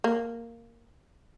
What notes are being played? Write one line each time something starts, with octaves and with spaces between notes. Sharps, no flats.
A#3